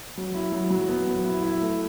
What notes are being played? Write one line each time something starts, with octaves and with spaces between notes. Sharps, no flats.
F#3
E4
F#3
F#3
B3
F#3
E4
E4
A3